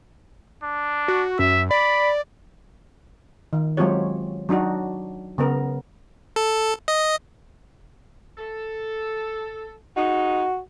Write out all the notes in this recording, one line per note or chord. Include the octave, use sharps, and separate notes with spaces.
D4
F#4
F#2 E5
D5 B5
D#3
F#3 G#3 C4 F4 G4 C#5
F#3 D4 D#4 F#4
C#3 B3 A#4
A4
D#5
A4
G#2 D#4 F#4